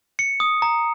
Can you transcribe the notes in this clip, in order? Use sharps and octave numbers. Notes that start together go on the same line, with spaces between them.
C#7
D#6
A#5